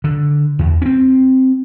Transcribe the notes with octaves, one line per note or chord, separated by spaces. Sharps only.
D3
E2
C4 C#4